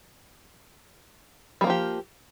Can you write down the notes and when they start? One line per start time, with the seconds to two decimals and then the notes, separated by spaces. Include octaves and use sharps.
1.61 G3
1.64 A#3
1.67 F3
1.70 G4